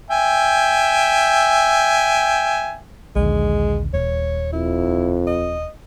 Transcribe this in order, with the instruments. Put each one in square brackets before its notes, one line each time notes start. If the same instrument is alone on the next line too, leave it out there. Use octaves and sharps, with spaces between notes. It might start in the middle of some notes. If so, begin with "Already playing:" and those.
[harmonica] E5 G5 G#5
[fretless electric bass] A#1 D#2 D3 [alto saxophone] G#3
[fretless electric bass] D#1 [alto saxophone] C#5
[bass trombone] F2 [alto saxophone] E4
[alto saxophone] D#5